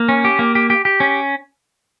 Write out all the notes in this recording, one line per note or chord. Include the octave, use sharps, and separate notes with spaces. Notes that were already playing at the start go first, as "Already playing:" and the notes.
Already playing: A#3
C#4
G4
A#3
G4
G4
G4
C#4